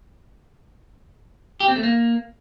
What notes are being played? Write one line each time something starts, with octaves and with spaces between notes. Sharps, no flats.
G4
C4
A3
A#3